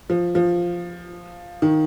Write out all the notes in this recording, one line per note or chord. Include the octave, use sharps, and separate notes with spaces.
F3
F3
D#3